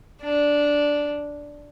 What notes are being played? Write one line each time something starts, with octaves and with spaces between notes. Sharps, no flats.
D4